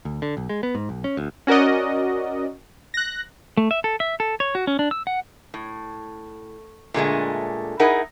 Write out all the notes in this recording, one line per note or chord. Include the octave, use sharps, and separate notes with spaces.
D2
D3
B1
G#3
B3
G#2
B1
C#4
D2
C#4 F#4 A#4 D5 D#5
F#6 A#6
A3
E5
A4
E5
A4
C#5
F#4
C#4
D4
E6
F#5
A2
A#2 D3 G#3 A3
D#4 E4 G#4 A#4 F#5